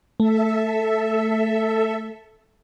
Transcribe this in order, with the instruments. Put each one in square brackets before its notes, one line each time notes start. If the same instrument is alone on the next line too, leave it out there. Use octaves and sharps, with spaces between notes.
[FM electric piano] A3 [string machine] A4 E5